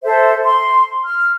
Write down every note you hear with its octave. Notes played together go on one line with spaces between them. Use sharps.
A4 C5 E5
C6
F6